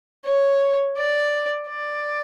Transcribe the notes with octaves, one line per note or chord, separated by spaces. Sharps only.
C#5
D5
D5